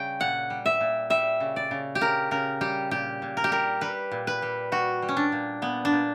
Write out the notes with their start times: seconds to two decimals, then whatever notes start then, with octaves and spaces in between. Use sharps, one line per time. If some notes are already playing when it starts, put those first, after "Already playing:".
Already playing: C#3 G3 G5
0.20 A#2 F#5
0.50 G3
0.66 E5
0.81 A#2
1.10 G3 E5
1.40 C#3
1.56 D5
1.71 C#3
1.95 G4
2.01 C#3 A#4
2.31 C#3 A#4
2.61 G3 G4
2.91 A#2 G4
3.22 A#2
3.37 A#4
3.44 G4
3.52 G3 A#4
3.81 G3 B4
4.12 A#2
4.27 B4
4.42 G3
4.72 G3 F#4
5.02 G3
5.09 C#4
5.17 D4
5.32 A#2
5.62 A#2 B3
5.85 D4
5.92 A#2